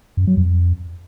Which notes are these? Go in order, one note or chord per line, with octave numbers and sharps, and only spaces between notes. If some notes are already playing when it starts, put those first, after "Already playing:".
F#2
F#3
F2